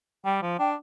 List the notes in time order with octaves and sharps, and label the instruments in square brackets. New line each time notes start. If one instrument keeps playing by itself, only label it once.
[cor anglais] G3 [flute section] G5
[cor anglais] F3
[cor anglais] D4 [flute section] G5